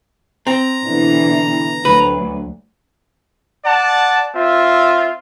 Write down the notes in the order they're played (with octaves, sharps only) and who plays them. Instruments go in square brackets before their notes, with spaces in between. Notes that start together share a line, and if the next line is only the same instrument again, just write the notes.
[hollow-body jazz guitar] C4 [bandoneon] A#5
[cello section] B2 D3 E3
[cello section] D2 F#3 [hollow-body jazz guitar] B4
[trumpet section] D5 F#5 A5
C4 F4 E5